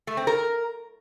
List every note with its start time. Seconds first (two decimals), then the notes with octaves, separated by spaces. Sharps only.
0.07 A3
0.17 C4
0.27 A#4